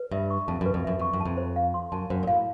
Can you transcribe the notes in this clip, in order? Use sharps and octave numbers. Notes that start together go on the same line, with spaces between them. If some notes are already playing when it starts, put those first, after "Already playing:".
Already playing: B4
G2 E5
C#6
F2 A5
F#2 B4
F2
F#2 E5
F2 C#6
F#2
A5
F2
C5
F5
C6
F#2 A5
F#2 C5
A#2
A2 F5